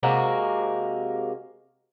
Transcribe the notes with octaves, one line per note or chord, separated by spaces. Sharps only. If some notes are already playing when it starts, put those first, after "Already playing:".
C3 G#3 A#3 F#4